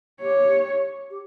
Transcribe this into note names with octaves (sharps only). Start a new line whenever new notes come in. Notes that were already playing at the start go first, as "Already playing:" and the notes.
G4 C#5
G4